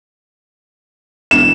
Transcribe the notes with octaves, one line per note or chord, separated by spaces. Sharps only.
E1 E7